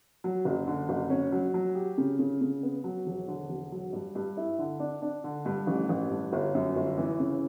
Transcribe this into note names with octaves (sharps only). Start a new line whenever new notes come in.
F#3
F#1
D3
F#1
C#4
F#3
F#3
G4
C#3
C#3
C#3
B3
F#3
E1
D3
E1
F#3
G2
G2
E4
D3
D4
D4
D3
G2
A1
A1
G2
G1
F#2
G1
E3
C#3